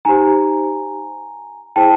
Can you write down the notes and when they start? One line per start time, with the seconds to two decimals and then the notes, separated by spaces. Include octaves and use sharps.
0.05 D#4 G4 C5 G#5 A#5
1.76 E4 G#4 C5 G5 A5